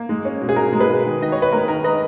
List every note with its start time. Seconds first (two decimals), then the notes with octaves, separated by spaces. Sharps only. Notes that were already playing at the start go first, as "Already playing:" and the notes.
Already playing: A#3
0.09 G#3
0.25 C#4
0.41 B2
0.49 G#4
0.56 B2 A#4
0.72 G#3
0.80 G#4 B4
0.89 B2
1.05 D#3
1.21 D#3 D#5
1.32 D#3 C#5
1.42 B4
1.53 G#3 A#4
1.68 D#3 A#4
1.84 D#3 B4 D#5